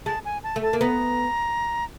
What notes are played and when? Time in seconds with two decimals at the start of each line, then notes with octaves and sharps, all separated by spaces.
0.06 G#3 A5
0.25 G#5
0.44 A5
0.56 A3
0.63 A5
0.73 A#3
0.80 B3 A#5